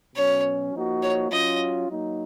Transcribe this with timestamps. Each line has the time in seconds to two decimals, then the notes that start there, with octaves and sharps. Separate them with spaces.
0.15 B2 F#3 C#4 C#5
0.74 F3 A#3 D#4 F#4
1.02 C#5
1.31 F#3 C#4 F4 D#5
1.89 F#3 A#3 D#4